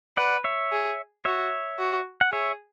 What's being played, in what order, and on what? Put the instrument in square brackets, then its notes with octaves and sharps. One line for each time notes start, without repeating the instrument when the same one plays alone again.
[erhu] B4 [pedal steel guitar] D5 F#5
[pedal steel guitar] C#5 E5
[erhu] G#4
[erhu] F#4 [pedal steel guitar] C#5 E5
[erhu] F#4
[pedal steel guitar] F#5
[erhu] G#4 [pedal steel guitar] C#5 E5